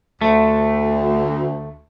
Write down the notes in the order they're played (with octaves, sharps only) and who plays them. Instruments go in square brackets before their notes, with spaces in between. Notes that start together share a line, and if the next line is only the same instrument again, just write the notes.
[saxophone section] D2 [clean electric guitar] A3